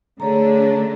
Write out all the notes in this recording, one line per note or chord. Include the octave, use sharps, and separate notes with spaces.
D3 A3 D4 G#4 C#5 A#5